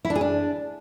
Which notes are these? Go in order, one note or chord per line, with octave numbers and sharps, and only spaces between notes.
E4
D4
G#4
D4